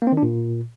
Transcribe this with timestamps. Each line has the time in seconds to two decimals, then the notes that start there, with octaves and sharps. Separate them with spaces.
0.02 A#3
0.07 C4
0.12 D#3
0.17 D4
0.22 A#2